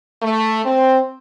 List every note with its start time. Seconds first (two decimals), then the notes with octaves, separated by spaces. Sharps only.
0.22 A3
0.64 C4